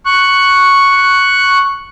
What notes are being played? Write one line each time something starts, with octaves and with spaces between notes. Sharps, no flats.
C#6 F#6